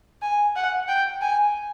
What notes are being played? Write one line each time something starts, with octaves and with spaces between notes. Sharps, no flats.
G#5
F#5
G5
G#5